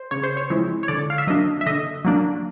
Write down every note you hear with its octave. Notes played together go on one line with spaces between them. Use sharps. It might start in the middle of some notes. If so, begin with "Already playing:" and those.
Already playing: C5
C#3 C#5
C5
C#5
F3 G#3 C4 E4
C#5
D3 D5
F5
E5
F#3 A#3 D4 D#5
E5
D3 D#5
F#3 A#3 D4